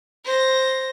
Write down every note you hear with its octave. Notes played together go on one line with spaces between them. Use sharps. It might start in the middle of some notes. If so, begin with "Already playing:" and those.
C5 A#6